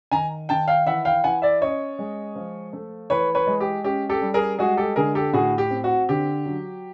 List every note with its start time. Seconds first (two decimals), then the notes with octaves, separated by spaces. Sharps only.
0.11 D#3 G#5 A#5
0.49 D#3 G5 A5
0.68 F5 G5
0.86 E3 E5 F#5
1.05 F5 G5
1.24 E3 F#5 G#5
1.42 D5 E5
1.61 C#4 C#5 D#5
1.99 G#3
2.36 F3
2.73 A3
3.10 E3 B4 C#5
3.35 B4 C#5
3.47 G#3
3.60 G4
3.84 C#4 G4
4.10 G4 A4
4.21 G3
4.34 G#4 A#4
4.59 G#3 F#4 G#4
4.77 G4 A4
4.96 D3 G#4 A#4
5.15 G4 A4
5.33 A2 F#4 G#4
5.58 G4
5.70 C4
5.84 F#4
6.09 D3 G4
6.46 F#3